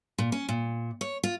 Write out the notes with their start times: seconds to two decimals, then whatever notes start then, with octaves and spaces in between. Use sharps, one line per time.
0.18 A#2
0.32 C#4
0.49 A#2
1.01 C#5
1.23 F4